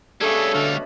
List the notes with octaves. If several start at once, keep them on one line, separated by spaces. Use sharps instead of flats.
C#3 G3 A3 B3 D4 G#4 A4
D2 B2 D3 G3 F5